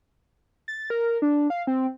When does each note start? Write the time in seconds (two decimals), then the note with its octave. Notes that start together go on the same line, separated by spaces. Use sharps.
0.68 A6
0.90 A#4
1.22 D4
1.50 F5
1.67 C4